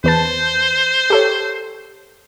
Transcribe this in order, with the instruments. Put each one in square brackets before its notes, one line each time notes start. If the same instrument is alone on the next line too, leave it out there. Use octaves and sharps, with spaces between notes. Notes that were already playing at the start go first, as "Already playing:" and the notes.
[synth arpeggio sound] E2 B4 A5 [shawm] C5
[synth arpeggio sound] G4 A4 C#5